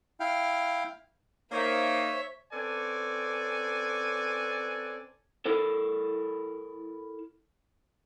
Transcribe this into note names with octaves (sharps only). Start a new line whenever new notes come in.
E4 F5 G5
A#3 D#4 C5 C#5 E5
C4 C#4 A4 B4 D5 G#5
E4 A4 A#4